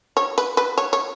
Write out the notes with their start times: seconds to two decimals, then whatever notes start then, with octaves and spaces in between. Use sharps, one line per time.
0.17 C#5
0.38 B4
0.57 B4
0.78 C#5
0.93 C#5